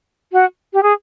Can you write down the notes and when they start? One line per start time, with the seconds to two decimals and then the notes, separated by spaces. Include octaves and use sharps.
0.32 F#4
0.73 G4
0.83 G#4